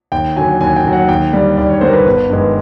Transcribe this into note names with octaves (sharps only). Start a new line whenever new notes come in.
D#2 G5
D3 F#3 G#5
D#2 G#5
G5
D3 F#3
F#5
D#2 G5
D3 G3 D5
D#2 D5
C#5
D3 G3 C5
A#4
B4
G1
G2 D#3 G#3